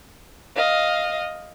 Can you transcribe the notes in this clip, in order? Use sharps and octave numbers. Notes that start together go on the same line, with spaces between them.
D#5 F5